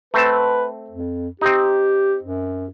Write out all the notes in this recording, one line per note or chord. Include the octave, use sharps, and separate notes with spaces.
A3 C4 B4 A5
F2
C4 D#4 G4
F#2